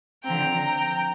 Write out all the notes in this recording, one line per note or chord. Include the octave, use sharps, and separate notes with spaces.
D3 F3 C4 G5 A#5